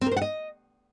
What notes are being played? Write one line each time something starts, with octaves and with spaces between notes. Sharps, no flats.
C4
A#4
C5
F#5
D#5